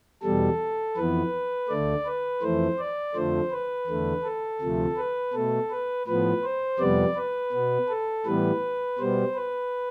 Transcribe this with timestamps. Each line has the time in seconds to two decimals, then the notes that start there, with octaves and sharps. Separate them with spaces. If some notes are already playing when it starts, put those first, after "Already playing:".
0.23 E2 B2 G3 A4
0.96 F2 E3 B3 B4
1.69 D2 D3 A3 D5
2.06 B4
2.42 F2 E3 A3 C5
2.79 D5
3.15 F2 D3 F3 A3 C5
3.51 B4
3.87 E2 D3 A3
4.24 A4
4.61 D2 C3 F3 A3
4.97 B4
5.34 B2 A3 A4
5.71 B4
6.07 A2 F3 B3 B4
6.44 C5
6.79 F2 C3 G3 B3 D5
7.16 B4
7.52 B2 B3
7.89 A4
8.26 A2 E3 G3 B3 B4
8.99 B2 G3 B3 C5
9.35 B4